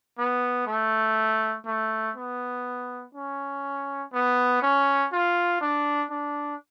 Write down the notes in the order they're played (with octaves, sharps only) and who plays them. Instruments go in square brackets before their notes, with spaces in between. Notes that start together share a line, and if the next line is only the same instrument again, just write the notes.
[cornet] B3
A3
A3
B3
C#4
B3
C#4
F4
D4
D4